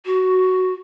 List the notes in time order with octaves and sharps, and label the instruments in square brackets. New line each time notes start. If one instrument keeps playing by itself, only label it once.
[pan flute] F#4